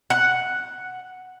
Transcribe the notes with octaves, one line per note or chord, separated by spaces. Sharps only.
F#5